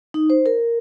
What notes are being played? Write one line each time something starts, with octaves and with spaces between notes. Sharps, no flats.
D#4
C5
A#4